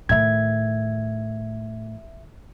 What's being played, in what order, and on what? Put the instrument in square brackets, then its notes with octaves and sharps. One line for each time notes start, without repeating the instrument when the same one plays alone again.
[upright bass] A2 D#3 [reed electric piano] E5 G#6